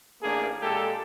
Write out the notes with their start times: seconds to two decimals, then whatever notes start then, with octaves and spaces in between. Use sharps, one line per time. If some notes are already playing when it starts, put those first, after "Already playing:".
0.23 A1 A3 A#3 D4 G#4
0.62 A#2 G#3 G4 A4